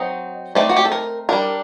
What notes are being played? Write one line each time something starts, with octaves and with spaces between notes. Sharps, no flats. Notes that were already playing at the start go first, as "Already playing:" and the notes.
Already playing: F#3 C4 D#4 D#5
A3 C4 D#4 D5
F#4
G4
A4
A#4
G3 D4 A#4